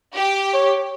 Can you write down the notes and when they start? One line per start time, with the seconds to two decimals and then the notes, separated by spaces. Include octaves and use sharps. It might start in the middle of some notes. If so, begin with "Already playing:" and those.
0.16 G4
0.54 C#5